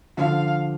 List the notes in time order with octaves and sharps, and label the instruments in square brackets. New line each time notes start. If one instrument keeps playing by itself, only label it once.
[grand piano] D3 F3 [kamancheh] F5